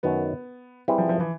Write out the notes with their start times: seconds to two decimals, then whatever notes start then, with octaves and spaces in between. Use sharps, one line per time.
0.03 F#2 D#3 F#3 B3
0.88 G3 C4 E4 G#4 B4
0.98 F3
1.09 F3
1.20 E3